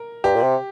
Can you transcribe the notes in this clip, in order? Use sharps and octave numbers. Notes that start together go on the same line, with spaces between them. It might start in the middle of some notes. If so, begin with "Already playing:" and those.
Already playing: A#4
G2 G4
A#2
C3